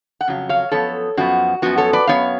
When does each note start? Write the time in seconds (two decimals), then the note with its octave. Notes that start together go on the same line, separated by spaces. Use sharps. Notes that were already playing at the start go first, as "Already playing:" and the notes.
0.21 F#5
0.28 F2 C#3 F#3
0.49 C#5 F5
0.71 F#2 F3 B3 A4 C#5
1.17 F#2 F3 B3 F#4
1.62 F#2 F3 B3 F#4
1.78 A4 C#5
1.93 B4 D5
2.07 F#2 F3 B3 C#5 F5